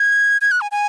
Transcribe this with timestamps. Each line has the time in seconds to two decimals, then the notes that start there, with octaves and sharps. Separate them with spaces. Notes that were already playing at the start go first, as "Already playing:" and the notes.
Already playing: G#6
0.41 G#6
0.52 F#6
0.61 G#5
0.72 G#5